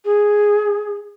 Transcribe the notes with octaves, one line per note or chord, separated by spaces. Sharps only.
G#4